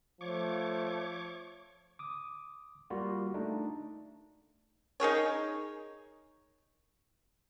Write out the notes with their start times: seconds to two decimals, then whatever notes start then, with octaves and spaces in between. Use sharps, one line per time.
0.21 F3 A3 C#5 C#6 D6
1.99 D6 D#6
2.90 G3 A#3 F4 F#4
3.34 A3 D4 D#4
5.00 D#4 G#4 A#4 C#5